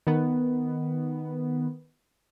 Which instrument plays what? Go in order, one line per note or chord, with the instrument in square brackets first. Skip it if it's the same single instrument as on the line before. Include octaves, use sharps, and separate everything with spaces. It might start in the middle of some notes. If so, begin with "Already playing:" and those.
[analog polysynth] D#3 B3